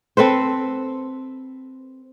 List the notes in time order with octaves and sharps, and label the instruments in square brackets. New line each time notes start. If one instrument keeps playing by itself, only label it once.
[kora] C4 A4 B4 C5